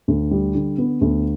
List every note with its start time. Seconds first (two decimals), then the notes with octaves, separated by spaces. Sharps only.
0.08 D2
0.31 G3
0.55 D3
0.78 B3
1.01 D2